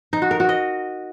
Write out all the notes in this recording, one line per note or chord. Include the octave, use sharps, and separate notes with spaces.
D#4
F#4
A#4
F#4
D#5